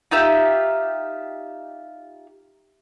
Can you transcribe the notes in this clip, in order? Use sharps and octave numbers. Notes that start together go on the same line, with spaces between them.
D#4 F4 G4 E5